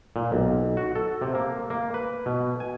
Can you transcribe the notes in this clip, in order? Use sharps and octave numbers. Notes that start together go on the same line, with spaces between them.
A#2
B1
F#4
A4
C3
A#3
A#3
B4
B2
G#5